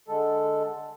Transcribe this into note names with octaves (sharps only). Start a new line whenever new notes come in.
D3 G#3 A4